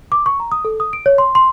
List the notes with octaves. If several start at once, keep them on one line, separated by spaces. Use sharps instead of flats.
D6
C#6
A#5
D#6
A4
D#6
D7
C#5
C6
C6